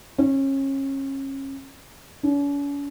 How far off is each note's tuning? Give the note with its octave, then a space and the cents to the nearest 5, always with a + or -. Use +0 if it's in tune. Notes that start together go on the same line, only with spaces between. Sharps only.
C#4 -30
C#4 +45